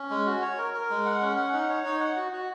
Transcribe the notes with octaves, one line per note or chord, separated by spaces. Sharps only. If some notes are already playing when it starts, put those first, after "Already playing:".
Already playing: C#4
G#3
F#4
C#5
A#4
A#4
G#3
F#5
C#4
F#5
D#4
C#5
D#4
F#5
F#4
F#4